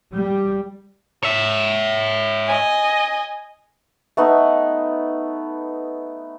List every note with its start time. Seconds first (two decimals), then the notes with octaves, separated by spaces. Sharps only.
0.14 G3
1.23 C#5 E5
2.46 D#5 G#5
4.17 A3 B3 D#4